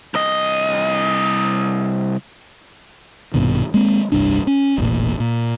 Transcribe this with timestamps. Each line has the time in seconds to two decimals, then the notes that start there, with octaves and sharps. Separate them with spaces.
0.14 C2 D#5
3.34 A#1 G2 B2 D#3
3.74 G#3 A#3 C4
4.12 F1 C2 G2 D4
4.47 C#4
4.78 E1 A1 A#2
5.20 A#2